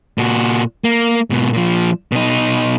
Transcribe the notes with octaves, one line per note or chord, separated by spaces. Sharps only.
A#2 F#4
A#3
G#2 B2
A#2 F3
B2 D#4